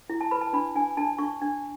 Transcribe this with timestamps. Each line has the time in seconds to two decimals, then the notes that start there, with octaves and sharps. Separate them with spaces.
0.10 E4
0.21 A5
0.31 B4 B5
0.41 A5
0.53 D4 B5
0.75 D4 G#5
0.97 D4 A5
1.18 D4 C#6
1.41 D4